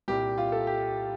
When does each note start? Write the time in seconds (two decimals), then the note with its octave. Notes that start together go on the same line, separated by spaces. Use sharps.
0.08 C2 A#2 G3 G4
0.38 F4
0.52 A4
0.67 G4